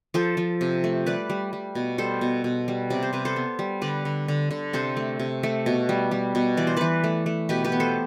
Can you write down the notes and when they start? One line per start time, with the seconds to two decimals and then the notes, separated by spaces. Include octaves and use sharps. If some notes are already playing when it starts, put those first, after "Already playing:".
0.14 F3 A4 C5
0.37 F3
0.61 C3
0.84 A3
1.06 G3 B4 D5
1.30 G3
1.53 G3
1.75 B2
1.98 G3 A4 C5
2.21 B2
2.44 B2
2.68 G3
2.90 C3 D5
3.03 C5
3.13 C3 B4
3.25 A4 C5
3.36 B3
3.59 G3
3.82 D3 B4 D5
4.05 D3
4.28 D3
4.51 D3
4.73 C3 A4 C5
4.97 A3
5.19 C3
5.43 A3
5.66 B2
5.89 G3
6.11 G3
6.35 B2
6.57 E3 D5
6.67 C5
6.77 E3 B4 D5
7.04 A3
7.26 A3
7.49 B2 G4 B4
7.64 G4 B4
7.72 B3
7.80 A4 C5